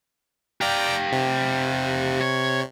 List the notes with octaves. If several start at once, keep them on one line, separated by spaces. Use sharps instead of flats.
G4 D5 F5 G5 A#5
C3
C#5